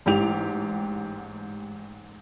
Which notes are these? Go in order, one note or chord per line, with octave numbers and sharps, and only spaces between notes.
A1 G#2 G4 F7